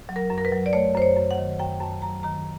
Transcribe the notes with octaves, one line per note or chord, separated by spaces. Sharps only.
F#3
A#4
F#2
A#4
B4
F#3
D5
A3 C#5
F#2 C5
C#5
F#2
F#5
D#3
F#2 G5
F#2 A5
F#3 A#5
D#3 A#5